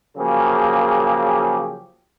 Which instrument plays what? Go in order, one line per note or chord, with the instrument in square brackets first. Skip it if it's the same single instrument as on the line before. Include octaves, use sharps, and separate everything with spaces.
[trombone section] C#3 F3 F#3 A#3 G4 G#4